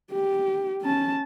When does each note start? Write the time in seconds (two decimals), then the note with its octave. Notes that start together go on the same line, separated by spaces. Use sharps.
0.12 G4
0.82 C#4 A5